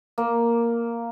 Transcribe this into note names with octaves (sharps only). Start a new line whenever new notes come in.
A#3